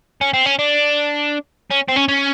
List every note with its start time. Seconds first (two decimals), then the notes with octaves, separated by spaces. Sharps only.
0.21 C#4
0.33 C4
0.46 C#4
0.59 D4
1.71 C#4
1.88 C4
1.96 C#4
2.08 C#4